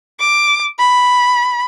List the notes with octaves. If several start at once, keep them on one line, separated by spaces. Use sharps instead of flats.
D6
B5